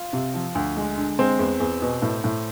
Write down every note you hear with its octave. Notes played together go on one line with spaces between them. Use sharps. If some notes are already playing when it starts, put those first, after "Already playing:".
Already playing: F4
C3
F3
D2
G#3
D3
G#3 C4
E2
E2
B2
A2
A2